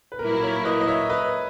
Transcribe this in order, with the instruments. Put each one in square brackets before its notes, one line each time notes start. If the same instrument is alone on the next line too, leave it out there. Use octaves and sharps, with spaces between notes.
[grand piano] B4
[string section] A#2 F#3 A#3 E4 [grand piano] A#4
[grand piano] A#4 C#5
B4 D#5
D#5
C#5 E5
B4 D#5